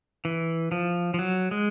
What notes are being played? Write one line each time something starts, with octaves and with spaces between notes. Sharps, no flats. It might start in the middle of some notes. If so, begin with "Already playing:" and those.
E3
F3
F3
F#3
G#3